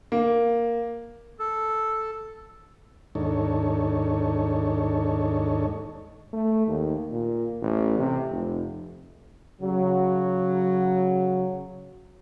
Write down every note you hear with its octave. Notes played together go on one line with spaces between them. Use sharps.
A#3
A4
D#2 G#2 D4 D#4 A4 C#5
A3
D#2
A#2
A1
C3
F1
C#3 F#3